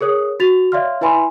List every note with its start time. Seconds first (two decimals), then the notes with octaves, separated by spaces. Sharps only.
0.01 G#4 A#4 C#5 D#6
0.40 F#4 A6 F7
0.72 C#5 D5 E5 F5 C6 F6
1.01 E4 B4 E5 G#5 B5 C6